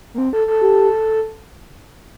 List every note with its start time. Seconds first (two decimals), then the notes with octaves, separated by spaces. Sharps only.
0.14 A#3
0.18 C4
0.33 A4
0.48 A4
0.62 G4